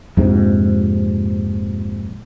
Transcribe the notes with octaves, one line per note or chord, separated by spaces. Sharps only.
A#1 F2 G#2 C3